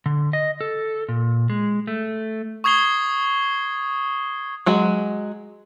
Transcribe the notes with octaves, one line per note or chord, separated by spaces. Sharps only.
D3
D#5
A4
A#2
G#3
A3
C#6 D#6 G#6 C7 G7
F#3 G#3 F#4